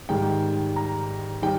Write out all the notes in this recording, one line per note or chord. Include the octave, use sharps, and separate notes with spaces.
G#2 D#3 G3 G5
A#5
D#3 G3 G5